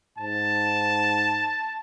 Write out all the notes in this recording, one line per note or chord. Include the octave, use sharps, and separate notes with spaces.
G#2 A5